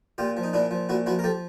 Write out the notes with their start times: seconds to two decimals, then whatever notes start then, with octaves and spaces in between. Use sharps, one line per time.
0.18 A#2 F4 G4
0.37 F3
0.43 D#4
0.53 A#2 D4 E4
0.71 F3
0.89 A#2 E4 F#4
1.06 F3 E4 F#4
1.19 A#4
1.24 F3 G4 A4